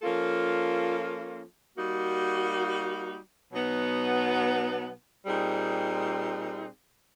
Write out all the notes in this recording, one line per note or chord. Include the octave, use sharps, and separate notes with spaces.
F3 A#3 C#4 F4 A4
G3 A#3 D#4 F#4
B2 F#3 B3 D#4
A#2 G3 C4 D#4 G#4